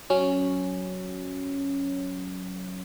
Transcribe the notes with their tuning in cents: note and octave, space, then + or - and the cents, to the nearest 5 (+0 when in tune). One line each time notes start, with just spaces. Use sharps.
F#3 +0 C#4 +0